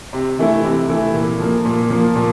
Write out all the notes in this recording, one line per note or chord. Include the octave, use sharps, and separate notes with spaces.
C3
E3 A3 E4
C3
E3 A3 E4
A#2
F3 A#3
A#2
F3 A#3
A#2